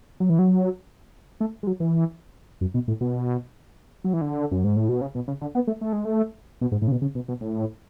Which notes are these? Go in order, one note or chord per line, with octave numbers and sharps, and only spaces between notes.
F#3
E3
F#3
A3
G#3
F#3
E3
F#2
B2
A2
B2
F#3
E3
D3
F#2
G#2
A2
B2
C#3
B2
C#3
D3
B3
A3
A3
G#3
A3
B2
G#2
A2
C#3
B2
C#3
B2
B2
A2